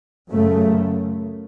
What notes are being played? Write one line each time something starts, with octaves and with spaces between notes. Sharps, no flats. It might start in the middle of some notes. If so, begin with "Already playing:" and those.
F#2 C#3 A3